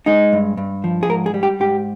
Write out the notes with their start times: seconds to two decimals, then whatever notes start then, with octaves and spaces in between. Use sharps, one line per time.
0.06 G#3 D#4
0.33 G2
0.57 G2
0.84 F3
1.03 G#4
1.09 G#2 A#4
1.26 G#4
1.34 G3
1.43 G4
1.60 G#2 G4